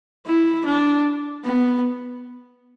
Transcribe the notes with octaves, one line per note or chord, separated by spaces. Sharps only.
E4
D4
B3